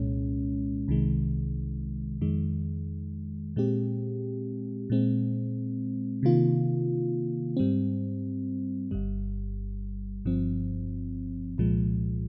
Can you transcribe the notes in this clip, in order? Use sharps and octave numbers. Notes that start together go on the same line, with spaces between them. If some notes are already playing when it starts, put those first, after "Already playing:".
Already playing: C2 A#2 G#3 C#4
C2 C3 D#3 G#3
F2 D#3 G#3
A#2 G#3 C4 G4
A#2 G#3 C4
C3 D#3 A#3 F4
G#2 G3 C4
G1 G2 G3
G1 G2 F3 C4
C2 A#2 F3 G#3